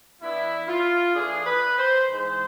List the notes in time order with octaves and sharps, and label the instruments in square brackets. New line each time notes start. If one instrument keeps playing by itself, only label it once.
[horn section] E3 B3 D4 E4
F4
E3 A3 D4 G#4
B4
C5
G#2 E3 G#3 C5